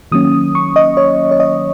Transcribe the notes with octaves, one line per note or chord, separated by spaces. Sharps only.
D#3 F#3 A#3 C#4 D#6
C#6
D#5
C#5
C#5
D#5